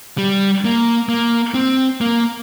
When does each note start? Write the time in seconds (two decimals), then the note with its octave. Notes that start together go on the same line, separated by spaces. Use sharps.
0.18 G3
0.65 A#3
1.09 A#3
1.54 C4
2.01 A#3